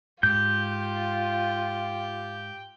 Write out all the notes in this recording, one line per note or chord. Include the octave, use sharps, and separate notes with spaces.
G#2 F4 G4 G5 G6